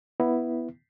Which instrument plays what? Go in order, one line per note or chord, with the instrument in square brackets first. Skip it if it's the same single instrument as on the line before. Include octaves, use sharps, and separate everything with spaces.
[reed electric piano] B3 E4